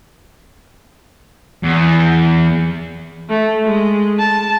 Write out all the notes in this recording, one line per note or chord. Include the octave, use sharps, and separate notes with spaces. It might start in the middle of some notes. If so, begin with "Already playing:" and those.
E2
A3
G#3
A5